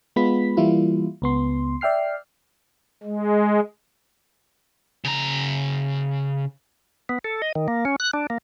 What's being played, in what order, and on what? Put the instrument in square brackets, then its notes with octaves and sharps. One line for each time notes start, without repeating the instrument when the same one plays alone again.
[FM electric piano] G#3 B3 F4 B5 B6
E3 G3 A#3 E4 F4
C#2 B3 C6
D5 E5 G5 F6 C7
[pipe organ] G#3
[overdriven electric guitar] C#3 A#5
[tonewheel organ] B3
A4
D#5
D#3
A#3
C#4
F#6
D4
A#3